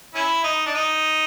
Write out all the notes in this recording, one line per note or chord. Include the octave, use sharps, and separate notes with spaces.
C#4 E4
D#4
D4
D#4